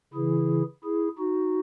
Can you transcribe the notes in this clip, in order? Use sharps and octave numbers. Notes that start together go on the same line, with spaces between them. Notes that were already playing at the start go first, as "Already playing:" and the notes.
C#3 E3 E4 G#4
E4 G#4
D#4 F#4